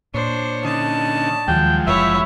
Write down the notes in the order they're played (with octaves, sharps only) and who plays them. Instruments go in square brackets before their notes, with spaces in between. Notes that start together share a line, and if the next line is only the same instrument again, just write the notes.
[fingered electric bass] A#2 [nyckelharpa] D4 C5 [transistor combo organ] C#5
[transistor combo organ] D3 C#4 D#4 [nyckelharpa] A5
[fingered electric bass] D#2 D#3 [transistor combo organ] F3 F#3 G#3 [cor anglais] G5
[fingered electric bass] F#1 F#2 E3 [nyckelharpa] E4 C#5 [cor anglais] E5